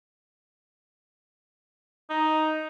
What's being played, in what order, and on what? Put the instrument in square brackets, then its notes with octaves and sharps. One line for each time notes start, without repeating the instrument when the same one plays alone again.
[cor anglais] D#4